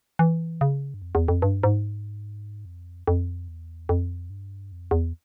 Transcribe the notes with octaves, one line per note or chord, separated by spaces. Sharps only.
E3
C#3
G2
F2
E2
F2
G2
G#2
F2
F2
E2
F2
G2
F2
E2